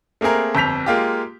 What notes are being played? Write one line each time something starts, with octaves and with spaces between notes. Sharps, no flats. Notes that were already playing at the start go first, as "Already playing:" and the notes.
A3 A#3 C4 G#4 A#4
G1 F2 G6 B6 F7
G#3 A#3 F4 G4